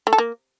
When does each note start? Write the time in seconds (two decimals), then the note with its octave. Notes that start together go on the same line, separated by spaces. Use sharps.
0.07 A3
0.13 A4
0.18 A#3